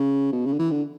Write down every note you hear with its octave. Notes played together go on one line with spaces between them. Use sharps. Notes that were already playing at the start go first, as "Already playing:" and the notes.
Already playing: C#3
B2
C#3
D3
E3
D3